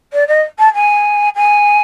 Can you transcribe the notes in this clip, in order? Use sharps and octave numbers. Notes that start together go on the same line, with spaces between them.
D5
D#5
A5
G#5
G#5